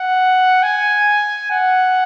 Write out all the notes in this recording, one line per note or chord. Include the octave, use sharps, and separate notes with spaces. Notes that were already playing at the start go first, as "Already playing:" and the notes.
Already playing: F#5
G#5
F#5